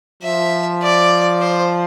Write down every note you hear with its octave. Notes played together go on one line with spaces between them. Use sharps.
F3 E5
D5
C5